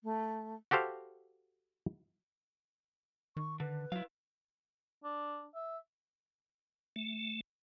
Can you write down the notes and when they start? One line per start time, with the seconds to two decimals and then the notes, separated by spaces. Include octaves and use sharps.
0.04 A3
0.71 F#4 G4 A4 C5 F5
3.37 D#3 C#6
3.60 D3 B4
3.92 F#3 E4 F5
5.04 D4
5.55 E5
6.96 A3